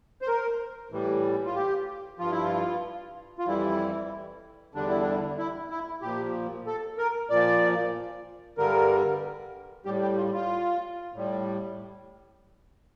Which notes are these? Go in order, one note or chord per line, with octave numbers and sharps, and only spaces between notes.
C5
A#4
A2 E3 G3
F4
G4
G2 F3 F4
E4
F4
F4
F2 E3 G3 E4
E2 D3 G3 D4
E4
D4
E4
E4
A#2 F3 G4
A4
A#4
A#2 F3 D5
G2 D3 G3 A#4
A2 G3 G4
G4
F4
F4
A2 G3